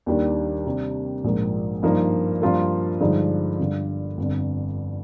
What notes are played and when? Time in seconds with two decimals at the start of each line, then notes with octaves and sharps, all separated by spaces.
0.06 D#2 D#3 G3 D4
0.66 C3 G3 D4
1.24 A#1 G#2 F3 A#3
1.83 G2 F3 A#3 D#4 A#4
2.42 G2 F3 A#3 F4 A#4
3.00 G2 D3 F3 G#3 D#4
3.59 G1 G2 D3
4.18 G1 F2 D3